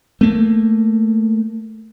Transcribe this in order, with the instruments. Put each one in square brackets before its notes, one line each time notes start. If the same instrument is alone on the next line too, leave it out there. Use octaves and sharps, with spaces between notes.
[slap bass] A3 A#3